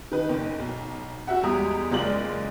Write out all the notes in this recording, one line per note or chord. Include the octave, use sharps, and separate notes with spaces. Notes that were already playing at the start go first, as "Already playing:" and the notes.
D#3 D#4 B4
F#1 D#4
B1
F#4 E5 F#5
E2 G3 G#3 A#5 D#6
F#1 G#3 F4 D5 F#7